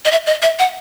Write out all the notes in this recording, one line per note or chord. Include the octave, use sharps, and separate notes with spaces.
D#5
E5
D#5
E5
F#5